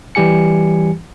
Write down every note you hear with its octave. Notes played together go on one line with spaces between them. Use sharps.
E3 G3 G4 G#5 C#7